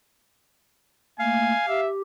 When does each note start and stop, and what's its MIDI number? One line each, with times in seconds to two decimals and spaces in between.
1.19 1.55 57
1.19 1.55 58
1.19 1.81 77
1.19 1.65 80
1.68 2.02 67
1.68 1.89 76